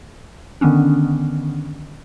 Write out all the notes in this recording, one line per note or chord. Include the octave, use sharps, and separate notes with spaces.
D3 D#3 B3 C#4 D4